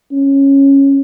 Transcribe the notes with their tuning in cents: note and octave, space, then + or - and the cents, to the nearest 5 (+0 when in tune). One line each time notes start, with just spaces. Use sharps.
C#4 -10